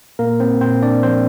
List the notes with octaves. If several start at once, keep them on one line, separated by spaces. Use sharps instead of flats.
A#2 A#3 A#4
C4 C5
A#2 C4 C5
D4 D5
F3 C4 C5